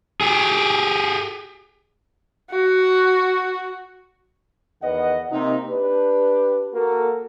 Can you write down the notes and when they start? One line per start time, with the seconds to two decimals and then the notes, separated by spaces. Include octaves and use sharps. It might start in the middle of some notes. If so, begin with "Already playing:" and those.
0.21 G4 G#4
2.50 F#4
4.82 E2 D#3 B4 D#5 F#5
5.31 C3 A#3 D#4
5.69 D4 G4 B4
6.73 A#3 F#4 A4 A#4